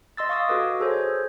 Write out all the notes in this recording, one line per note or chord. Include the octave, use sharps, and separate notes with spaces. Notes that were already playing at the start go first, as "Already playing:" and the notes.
D#5 C6 E6 A6
F5 C#6 D#6 E6
F#4 A4 B4 D#5 D6
G#4 A4 C5 C#5